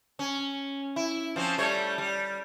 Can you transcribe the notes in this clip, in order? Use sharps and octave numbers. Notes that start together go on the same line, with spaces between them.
C#4
E4
F3 C4 C#4
G3 A3 C#5
G3